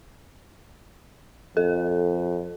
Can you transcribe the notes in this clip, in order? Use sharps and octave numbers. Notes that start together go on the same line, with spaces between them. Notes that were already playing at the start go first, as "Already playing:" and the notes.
F2 A4